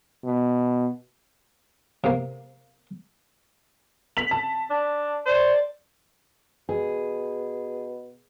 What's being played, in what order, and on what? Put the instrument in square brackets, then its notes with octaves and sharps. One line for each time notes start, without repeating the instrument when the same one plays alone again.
[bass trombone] B2
[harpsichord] C3 A#3
[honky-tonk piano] B6 F7 F#7
A5
[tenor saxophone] D4
[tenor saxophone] C5 [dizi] D5
[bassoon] B2 [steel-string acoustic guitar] G#4